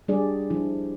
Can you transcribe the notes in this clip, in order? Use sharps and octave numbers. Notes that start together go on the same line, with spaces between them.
G3 D4 G#4 D5
F3 D4 E4